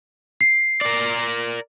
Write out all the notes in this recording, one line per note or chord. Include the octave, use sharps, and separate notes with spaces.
C7
A#4 D5